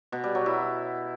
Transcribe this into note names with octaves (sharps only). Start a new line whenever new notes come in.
B2
G3
F#3
E4